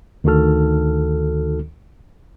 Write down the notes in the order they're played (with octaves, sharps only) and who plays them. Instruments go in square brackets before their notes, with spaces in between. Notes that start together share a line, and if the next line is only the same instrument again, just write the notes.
[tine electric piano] D2 D#3 D#4 F#4 A4 F6